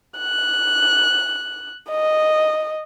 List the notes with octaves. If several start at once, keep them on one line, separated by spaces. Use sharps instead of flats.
F#6
D#5